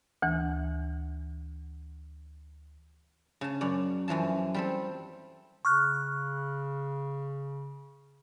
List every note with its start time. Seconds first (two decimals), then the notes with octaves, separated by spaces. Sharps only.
0.22 D2 E3
3.41 C#3 A5
3.61 F#2 C#4 D5
4.08 F#2 E3 F3 A5
4.54 G3 C4 A4
5.65 C#3 C#6 F6 F#6